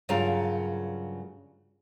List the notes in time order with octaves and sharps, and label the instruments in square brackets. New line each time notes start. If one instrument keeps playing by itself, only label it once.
[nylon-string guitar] G2 C#3 F#3 G3 F4 A#4